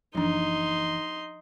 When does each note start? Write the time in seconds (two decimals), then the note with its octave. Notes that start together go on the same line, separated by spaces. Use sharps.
0.15 F#1 E3 F3 D4 D#4 C6